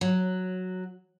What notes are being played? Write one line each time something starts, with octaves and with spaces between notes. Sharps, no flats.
F#3